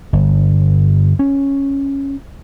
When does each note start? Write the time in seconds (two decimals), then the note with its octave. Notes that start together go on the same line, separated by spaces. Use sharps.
0.13 G1
1.19 C#4